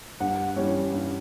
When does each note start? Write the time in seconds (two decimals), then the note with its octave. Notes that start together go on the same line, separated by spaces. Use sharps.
0.20 G2 F#5
0.56 E3 G3 C#4
0.93 G2